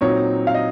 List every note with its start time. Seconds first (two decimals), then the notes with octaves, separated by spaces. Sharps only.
0.01 A#2 F#3 C4 D#4 C#5
0.47 F5
0.55 D#5